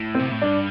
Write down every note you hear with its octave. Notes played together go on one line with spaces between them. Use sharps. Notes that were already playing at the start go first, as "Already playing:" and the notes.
Already playing: A2
C4
C3
A2
G2 D4